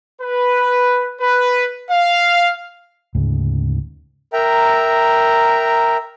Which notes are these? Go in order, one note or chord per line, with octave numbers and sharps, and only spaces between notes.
B4
B4
F5
D2 G#2 C#3
A#4 E5 G5 A#5